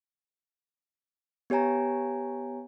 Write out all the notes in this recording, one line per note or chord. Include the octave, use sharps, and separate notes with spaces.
B3 G4 C#5 G#5 A#5